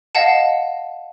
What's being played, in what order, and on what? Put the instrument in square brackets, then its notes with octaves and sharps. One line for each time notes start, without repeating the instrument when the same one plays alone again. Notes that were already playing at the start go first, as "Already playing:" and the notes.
[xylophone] D#5 F5 F#5 A5